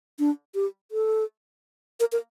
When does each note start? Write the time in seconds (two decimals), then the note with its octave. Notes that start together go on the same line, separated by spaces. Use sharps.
0.19 D4
0.55 G4
0.92 A4
2.00 A#4
2.12 A#4